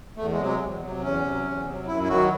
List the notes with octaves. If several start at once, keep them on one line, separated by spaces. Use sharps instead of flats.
E2 A3
G#3
C3 F#3
G#3
E2
C3 F#3
E2 C#4
C3 F#3
E2
C3 F#3
F#2 E4
E4
D#3 F#3 F#4